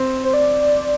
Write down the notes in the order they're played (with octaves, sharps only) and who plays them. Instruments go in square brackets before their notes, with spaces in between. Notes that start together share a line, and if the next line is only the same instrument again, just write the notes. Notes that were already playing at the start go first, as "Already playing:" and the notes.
Already playing: [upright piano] C4
[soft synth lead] C5
D5